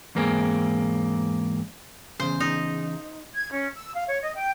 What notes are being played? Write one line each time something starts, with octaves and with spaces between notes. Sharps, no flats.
E2 G#2 A#3 C4 G#4
E2 C#3 C5
D#4
G#6
C#4
E6
F5
C#5
D#5
G5